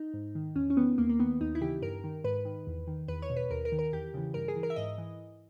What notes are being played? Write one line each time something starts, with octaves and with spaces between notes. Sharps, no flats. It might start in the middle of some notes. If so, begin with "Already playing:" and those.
Already playing: D#4
G#2
D#3
E2 C#4
C#4
D#3 B3
D#2 A#3
A#3
D#3 B3
D#2 D#4
E4
C#3 E3 G4
G2 A#4
D#3
G#2 B4
D#3
E2
D#3
E2 B4
C#5
B2
B4
D#2 A#4
A#4
D#3
A#4
E2 G4
C#3 E3
G2 A#4
G#4
E3
A#4
E5
G#2 D#5
E3